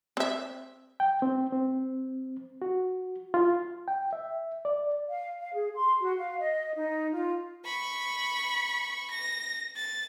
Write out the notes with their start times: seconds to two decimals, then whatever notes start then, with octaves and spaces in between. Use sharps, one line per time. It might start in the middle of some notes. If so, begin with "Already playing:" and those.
0.17 C4 E5
1.00 G5
1.22 C4
1.52 C4
2.62 F#4
3.34 F4
3.88 G5
4.13 E5
4.65 D5
5.09 F5
5.40 F5
5.55 G#4
5.75 C6
6.02 F#4
6.18 F5
6.39 D#5
6.74 D#4
7.12 F4
7.65 B5 C#6
9.10 A#6
9.76 A6